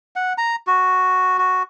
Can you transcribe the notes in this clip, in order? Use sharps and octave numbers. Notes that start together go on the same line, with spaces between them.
F#5
A#5
F#4
F#4